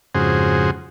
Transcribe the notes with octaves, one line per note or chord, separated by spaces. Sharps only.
F2 G#2 C#3 F#4 G#4 C5